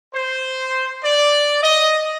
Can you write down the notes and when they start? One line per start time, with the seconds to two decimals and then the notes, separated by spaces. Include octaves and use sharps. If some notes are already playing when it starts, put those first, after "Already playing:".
0.14 C5
1.04 D5
1.63 D#5